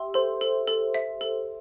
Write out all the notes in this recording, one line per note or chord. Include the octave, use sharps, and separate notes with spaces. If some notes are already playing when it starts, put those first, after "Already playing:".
Already playing: G4 E5 C6
A4 C5
A4
A4
E5
A4